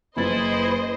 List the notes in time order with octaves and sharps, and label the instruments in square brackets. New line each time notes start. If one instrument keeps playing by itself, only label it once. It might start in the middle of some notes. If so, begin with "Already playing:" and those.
[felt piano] F#1 A6 [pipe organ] E4 [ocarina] B4 [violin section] C5 D#5